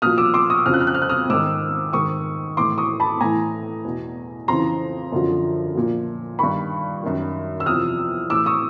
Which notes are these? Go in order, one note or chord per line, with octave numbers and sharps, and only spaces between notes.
A#2 F3 D#6 F6
D6 E6
C6 D6
C#6 D#6
F2 C#3 F3 F6
F#6
F6
F#6
F6
F#6
D#6 F6
G#2 D#3 D6 E6
G#2 D#3 C#6 D#6
A2 E3 C6 D6
C#6 D#6
A5 B5
A2 E3 G#5 A#5
E2 B2
F2 C#3 E3 A#5 C6
F#2 D3 F3
A#2 F3
G2 D#3 B5 C#6
F#2 D#3
E6
E2 C3 F3 D#6 F6
A2 E3 D6 E6
C#6 D#6